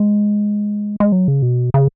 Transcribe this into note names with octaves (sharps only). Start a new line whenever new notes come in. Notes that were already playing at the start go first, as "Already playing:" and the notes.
Already playing: G#3
G#3
F#3
C#3
B2
C#3